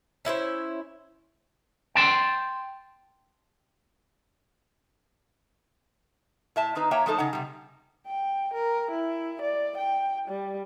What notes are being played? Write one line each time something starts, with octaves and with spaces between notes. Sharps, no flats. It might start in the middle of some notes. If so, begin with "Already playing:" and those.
C#4 E4 B4 C5
G5 A5 C6
A2 E5 A5
D#3 C4 D#4 B4
A#3 C#5 E5 G5 A#5
F3 A3 D#4 A4 C5
C#3 D#4 F#5
C3 G3
G5
A#4
E4
D5
G5
G3